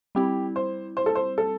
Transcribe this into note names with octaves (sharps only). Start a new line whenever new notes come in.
G3 C4 E4 G4
C5
C5
A4
C5
A4